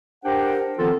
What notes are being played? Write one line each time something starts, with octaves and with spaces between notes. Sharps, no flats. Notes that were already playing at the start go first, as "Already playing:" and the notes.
D4 G4 A#4 C5 F#5 G5
D#3 F3 B3 C4 F4 A4